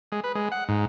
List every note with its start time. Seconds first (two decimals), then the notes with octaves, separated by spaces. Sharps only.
0.12 G#3
0.24 B4
0.35 G#3
0.52 F#5
0.69 G#2